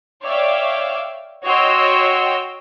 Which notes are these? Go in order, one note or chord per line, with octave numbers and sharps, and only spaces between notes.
C#5 D5 E5 F5 G5 D6
F#4 C#5 D#5 G5 C6 E6